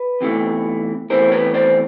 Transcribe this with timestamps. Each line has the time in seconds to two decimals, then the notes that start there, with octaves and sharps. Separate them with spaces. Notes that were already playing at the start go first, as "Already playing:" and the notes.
Already playing: B4
0.21 E2 C3 E3 A3
1.10 E2 C3 E3 A3 A#4 C5
1.32 B4 C#5
1.54 C5 D5